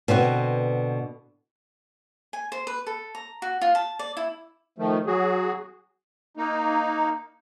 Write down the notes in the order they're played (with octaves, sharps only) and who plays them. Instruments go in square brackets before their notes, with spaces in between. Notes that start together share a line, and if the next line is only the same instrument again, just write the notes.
[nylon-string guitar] B2 D3 C4 F#4
[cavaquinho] G#5
C5
B4
A4
A#5
F#4
F4
A5
D5
E4
[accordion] D#3 F3 A3
F#3 F#4 G#4
A#3 D#4